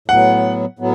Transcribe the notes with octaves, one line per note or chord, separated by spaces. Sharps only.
A2 F#3 B3 F#5
A2 F#3 B3